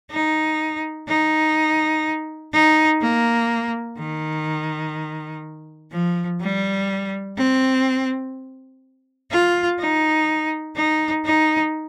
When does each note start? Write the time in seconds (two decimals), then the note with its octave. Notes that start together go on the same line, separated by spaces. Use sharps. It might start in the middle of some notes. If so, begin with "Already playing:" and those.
0.11 D#4
1.08 D#4
2.53 D#4
3.01 A#3
3.99 D#3
5.92 F3
6.41 G3
7.37 C4
9.31 F4
9.80 D#4
10.76 D#4
11.25 D#4